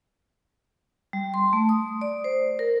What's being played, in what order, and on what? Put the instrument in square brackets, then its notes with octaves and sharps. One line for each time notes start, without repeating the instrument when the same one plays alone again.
[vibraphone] G3
C6
A3
D#6
D5
C5
A#4